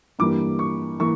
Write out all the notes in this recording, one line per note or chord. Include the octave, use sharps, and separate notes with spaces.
G2 E3 G3 A#3 D6
C#6
E3 A#3 C#6